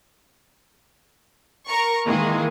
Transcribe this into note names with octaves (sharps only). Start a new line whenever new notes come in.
A#4 A#5 C#6
D#3 E3 G#3 A#3 G#4